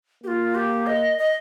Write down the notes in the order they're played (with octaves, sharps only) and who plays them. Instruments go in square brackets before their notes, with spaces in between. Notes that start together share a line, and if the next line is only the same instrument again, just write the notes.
[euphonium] A#3 [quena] G4
[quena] F4
G4
D#5
D#5